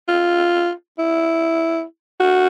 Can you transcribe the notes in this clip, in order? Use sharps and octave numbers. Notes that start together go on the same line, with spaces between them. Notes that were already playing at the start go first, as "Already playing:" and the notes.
F4
E4
F#4